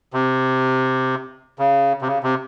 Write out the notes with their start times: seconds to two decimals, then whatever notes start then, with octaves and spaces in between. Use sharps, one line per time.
0.13 C3
1.59 C#3
2.02 C3
2.07 C#3
2.23 C3